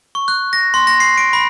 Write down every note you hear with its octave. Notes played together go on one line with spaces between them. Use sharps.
C#6
F#6
A#6
C6
A#6
C7
D7
B5